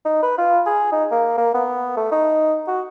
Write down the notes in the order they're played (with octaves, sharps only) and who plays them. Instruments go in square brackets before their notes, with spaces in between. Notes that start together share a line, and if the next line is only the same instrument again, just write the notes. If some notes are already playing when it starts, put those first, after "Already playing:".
[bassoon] D#4
B4
F4
G#4
D#4
A#3
A#3
B3
A3
D#4
F#4